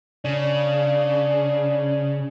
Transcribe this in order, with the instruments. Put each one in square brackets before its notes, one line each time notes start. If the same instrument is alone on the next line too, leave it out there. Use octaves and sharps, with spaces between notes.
[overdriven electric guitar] C#3 [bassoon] D4